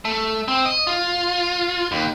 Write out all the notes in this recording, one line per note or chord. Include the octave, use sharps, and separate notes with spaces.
A3
C4
D#5
F4
D#2